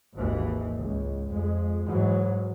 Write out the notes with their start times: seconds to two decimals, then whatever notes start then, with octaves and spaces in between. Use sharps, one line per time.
0.14 G#1 D#2 E3
0.77 C#2
1.28 F2 G#3
1.85 G#2 E3 F#3